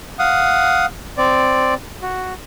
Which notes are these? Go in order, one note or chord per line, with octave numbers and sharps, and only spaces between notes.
F5 F#5 D#6
C4 D5
F#4